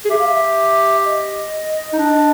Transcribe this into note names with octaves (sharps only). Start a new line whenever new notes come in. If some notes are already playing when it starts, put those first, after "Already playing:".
G#4
G4 E5
F5
E5
D#5
D#4
D4